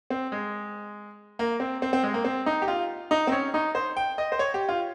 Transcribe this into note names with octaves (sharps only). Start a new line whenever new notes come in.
C4
G#3
A#3
C4
C4
C4
G#3
A#3
C4
D#4
G4
F4
D#4
C4
C#4
D#4
C5
G5
D#5
C5
C#5
G4
F4